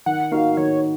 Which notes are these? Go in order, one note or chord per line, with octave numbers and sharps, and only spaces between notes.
D#3 F#5
A#3 D#4 F#4 F5
D#3 C#5